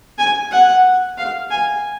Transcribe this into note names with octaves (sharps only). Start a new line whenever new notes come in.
G#5
F#5
F5
G#5